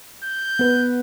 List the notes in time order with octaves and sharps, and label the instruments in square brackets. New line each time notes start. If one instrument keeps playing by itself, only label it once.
[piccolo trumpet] G6
[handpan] B3 B4